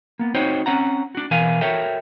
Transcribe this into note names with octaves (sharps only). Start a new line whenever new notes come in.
A#3 B3
C4 D#4 F#4 C5 C#5 G5
C4 C#4 F#5 A#5
D4 F#4
B2 E3 A#4 F5 G#5
F#4 A4 A#4 C#5 E5 G5